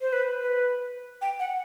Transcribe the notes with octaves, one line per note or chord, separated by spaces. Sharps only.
C5
B4
B4
G5
F#5